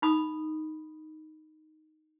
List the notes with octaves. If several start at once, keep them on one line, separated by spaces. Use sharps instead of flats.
D#4 B5 D#6